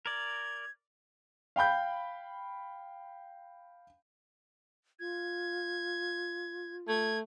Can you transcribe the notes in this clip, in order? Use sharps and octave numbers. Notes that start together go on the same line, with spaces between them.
A#4 D5 G#6
F5 G5 B5 G6
F4 G#6
A3 G#6